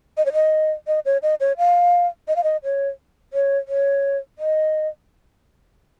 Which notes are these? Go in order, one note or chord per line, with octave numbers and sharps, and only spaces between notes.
D#5
C#5
D#5
D#5
C#5
D#5
C#5
F5
D#5
F5
D#5
C#5
C#5
C#5
D#5